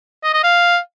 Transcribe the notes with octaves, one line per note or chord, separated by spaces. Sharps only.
D#5
D#5
F5